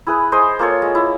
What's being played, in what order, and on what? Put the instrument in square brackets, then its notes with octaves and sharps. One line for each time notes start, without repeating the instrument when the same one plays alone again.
[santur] E4 G#4 B4
G#3 C5 C6 D#6
A#3 F4 A4 C#5
G#3
E4